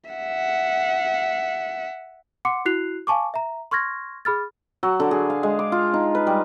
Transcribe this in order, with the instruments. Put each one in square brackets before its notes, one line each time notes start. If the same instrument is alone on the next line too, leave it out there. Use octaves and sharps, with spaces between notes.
[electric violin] E5 F#5
[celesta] F#5 C6 D6 C#7
E4 F#4 F#6 C7 F7
F5 G#5 A5 C#6 D6
E5 A#5
C6 C#6 F6 G#6 A#6
G#4 B5 F6 A6
[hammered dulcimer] F#3
D3
G#4
F5
G#3
D6
F4
D#4
B4
G3